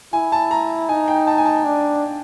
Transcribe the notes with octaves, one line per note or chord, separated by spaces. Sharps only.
E4 G#5
A5
A#5
D#4 G#5
G5
A5
G#5
A5
D4